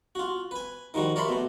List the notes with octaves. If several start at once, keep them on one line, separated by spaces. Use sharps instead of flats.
F4 F#4
B4 G#5
D#3 F3 G3 F#4
A#4 C#5 D5 E5 B5 C6
B2 A3